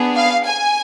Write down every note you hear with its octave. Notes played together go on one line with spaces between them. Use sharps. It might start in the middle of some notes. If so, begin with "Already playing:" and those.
Already playing: B3 D4 G#4
F5
G#5